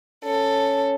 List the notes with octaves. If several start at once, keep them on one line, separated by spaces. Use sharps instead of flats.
C#4 A4